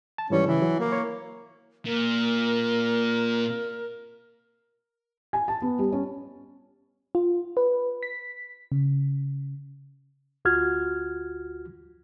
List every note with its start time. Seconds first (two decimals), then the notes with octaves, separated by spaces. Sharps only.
0.18 A5
0.30 G#2 E3 G3 C#4
0.47 C#3 E3
0.62 F#3
0.80 A#3
0.92 C#5
1.86 A#2 A#4
5.33 G#5
5.48 A5
5.62 B3
5.79 G3
5.92 C#4
7.15 F4
7.57 B4
8.03 B6
8.72 C#3
10.45 D2 F4 F#4 F6 G#6